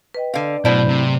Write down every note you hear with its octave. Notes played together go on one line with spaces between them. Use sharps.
B4 D#5 G5
D3 F5
G#2 B2 F#3 A3 E4 C5 D5 A5
C3